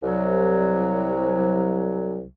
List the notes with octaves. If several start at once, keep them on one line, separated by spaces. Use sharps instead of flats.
C2 F#3